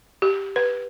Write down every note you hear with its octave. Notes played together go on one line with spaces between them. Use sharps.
G4
B4